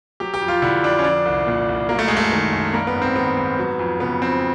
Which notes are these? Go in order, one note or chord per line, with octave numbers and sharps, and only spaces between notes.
F#3 G4
G4
F2
F4
D3 E4
F2 D4
C#4
F3 D4
C2
A#2
C2
F#3 A#3
A3
F#2 G#3
A3
D#3
F#2
G3 A#3
B3
G#2
C4
D#3 B3
G#2
F#3
F2
C#3 B3
F2 C4